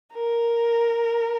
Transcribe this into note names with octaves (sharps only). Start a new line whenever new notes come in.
A#4